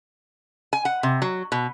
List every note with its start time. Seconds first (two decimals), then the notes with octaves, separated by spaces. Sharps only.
0.73 G#5
0.85 F#5
1.03 C3
1.22 F#3
1.52 B2